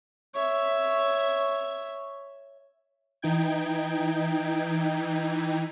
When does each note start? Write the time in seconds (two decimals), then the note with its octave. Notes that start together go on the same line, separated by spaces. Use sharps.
0.35 C#5 E5
3.22 E3 D#4 G5 G#6